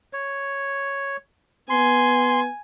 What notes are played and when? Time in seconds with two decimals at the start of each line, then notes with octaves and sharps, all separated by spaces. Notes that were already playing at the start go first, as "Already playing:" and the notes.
0.13 C#5
1.70 B3 G#5 C6